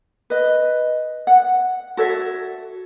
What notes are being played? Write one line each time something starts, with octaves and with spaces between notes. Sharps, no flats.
B4 D#5
F#5
F#4 A4 C#5 E5